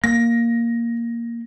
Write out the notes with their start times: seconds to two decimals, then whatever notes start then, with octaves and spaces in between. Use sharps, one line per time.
0.04 A#3 A#6